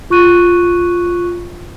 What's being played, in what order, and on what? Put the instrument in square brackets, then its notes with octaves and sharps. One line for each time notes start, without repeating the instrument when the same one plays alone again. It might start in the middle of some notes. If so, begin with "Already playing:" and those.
[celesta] F4 C#6 F#6 D#7